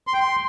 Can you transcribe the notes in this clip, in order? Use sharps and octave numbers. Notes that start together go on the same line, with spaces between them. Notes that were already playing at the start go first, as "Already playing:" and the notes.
C6
G5
C6